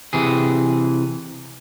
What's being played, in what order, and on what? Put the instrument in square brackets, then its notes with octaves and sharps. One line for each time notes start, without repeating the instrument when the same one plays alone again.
[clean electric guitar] C3 E3 G#4